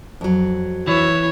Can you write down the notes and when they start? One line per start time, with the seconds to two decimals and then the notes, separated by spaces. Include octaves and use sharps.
0.21 F2 F#3
0.87 E3 C#5